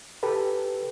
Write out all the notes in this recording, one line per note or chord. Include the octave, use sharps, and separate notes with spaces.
G4 A4 B4